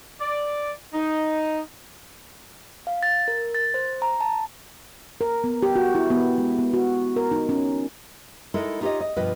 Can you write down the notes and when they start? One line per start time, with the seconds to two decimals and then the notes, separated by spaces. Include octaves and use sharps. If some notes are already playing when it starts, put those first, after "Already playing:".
0.20 D5
0.94 D#4
2.87 F5
3.03 A6
3.28 A#4
3.55 A6
3.74 C5
4.02 A#5
4.21 A5
5.21 A#4
5.44 B3
5.63 G4
5.76 F#4
5.95 E4
6.10 B3
6.38 G#3
6.59 B3
6.74 F#4
7.16 A#4
7.31 D#4
7.49 C#4
8.54 G#3 D#4 E4 A4 A#4 D#5
8.81 D#4 F4 G4 C5 C#5 D#5
9.00 D#5
9.16 G2 B2 F3 F4 B4 D#5